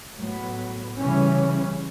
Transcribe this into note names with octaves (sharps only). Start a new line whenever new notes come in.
A2 F#3 B3
C#3 E3 G3 C#4